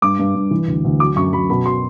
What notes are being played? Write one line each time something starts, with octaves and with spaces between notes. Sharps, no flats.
G2 D6
G2
G2
E3
D2
D2
F#3 D6
F#2 C#6
F#2 B5
B2 B5
F#3 C6